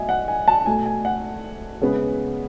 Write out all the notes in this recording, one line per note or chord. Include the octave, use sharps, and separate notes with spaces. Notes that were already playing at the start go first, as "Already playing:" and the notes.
Already playing: B2 F#3 A3 D#5 E5 G#5
F#5
G#5
A5
B2 A3 G#5
G#5
F#5
C#3 G#3 B3